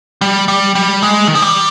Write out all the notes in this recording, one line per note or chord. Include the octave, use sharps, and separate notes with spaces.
G3
G3
G3
G#3
D#3
F3
G3